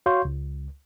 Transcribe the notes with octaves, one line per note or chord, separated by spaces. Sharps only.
F#4 C#5 F5 C6 C#6 G6
C#2